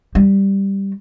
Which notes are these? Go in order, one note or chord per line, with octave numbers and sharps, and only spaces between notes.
G3